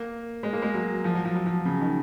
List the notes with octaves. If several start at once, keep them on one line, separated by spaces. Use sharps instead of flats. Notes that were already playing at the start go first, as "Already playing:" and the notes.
Already playing: A#3
G#3
A#3
G#3
F#3
F3
F#3
F3
F#3
F3
C#3
D#3